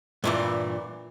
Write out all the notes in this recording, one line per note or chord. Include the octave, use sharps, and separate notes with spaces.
G2 A#2 E3